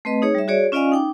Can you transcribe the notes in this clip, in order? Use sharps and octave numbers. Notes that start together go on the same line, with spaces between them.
A3 C4 B4 D#5
D#4 G#4 C#5
G3 E5
F#4 G#4 C#5 D5
C#4 F4 D5 D#5 F5 G#5
D#4 G5 D6